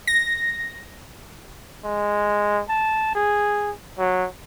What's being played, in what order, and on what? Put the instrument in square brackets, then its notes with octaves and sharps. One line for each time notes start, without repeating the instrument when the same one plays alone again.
[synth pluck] A#6
[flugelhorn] G#3
A5
G#4
F#3